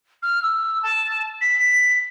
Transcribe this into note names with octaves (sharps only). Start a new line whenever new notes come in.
F6
E6
A5
B6